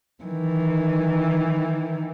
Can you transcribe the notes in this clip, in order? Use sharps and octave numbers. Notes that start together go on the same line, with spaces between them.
D#3 E3